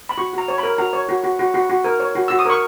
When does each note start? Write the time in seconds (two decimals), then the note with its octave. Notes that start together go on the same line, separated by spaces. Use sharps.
0.09 B5
0.18 F#4 C#6
0.33 F#4 A#5
0.48 C#5
0.58 A#4 B5
0.78 F#4 A#5
0.93 C#5
1.09 F#4
1.24 F#4
1.39 F#4
1.54 F#4
1.70 F#4
1.84 A#4
2.00 C#5
2.15 F#4
2.28 F#4 E6
2.39 D#6
2.45 A#4 C#6